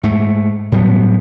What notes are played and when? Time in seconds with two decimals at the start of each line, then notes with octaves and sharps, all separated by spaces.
0.03 G#2 A3
0.72 A2 F#3 G3 B3